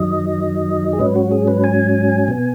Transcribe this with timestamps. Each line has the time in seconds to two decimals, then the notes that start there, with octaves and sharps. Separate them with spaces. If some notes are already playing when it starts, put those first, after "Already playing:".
Already playing: F#2 D#3 F#3 D#5
0.93 G#4
0.99 G#2 F#3 C#4 B4
1.16 F#4
1.31 G#4
1.48 B4
1.64 G#5
2.28 B2 B3